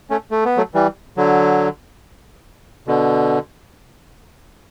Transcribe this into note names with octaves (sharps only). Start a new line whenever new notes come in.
A3 C#4
A3
B3
F#3 A3
E3 G3
D3 F#3
B2 D3